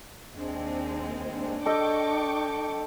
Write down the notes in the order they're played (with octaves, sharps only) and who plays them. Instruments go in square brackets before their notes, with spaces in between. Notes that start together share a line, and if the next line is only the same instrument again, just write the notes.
[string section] D#2 G#3 C4 [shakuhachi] D4
[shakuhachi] D4
[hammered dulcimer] A4 D#5 [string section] G5 C#6 D6